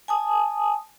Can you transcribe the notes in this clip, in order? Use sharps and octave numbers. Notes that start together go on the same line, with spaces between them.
G#5 A5 D#6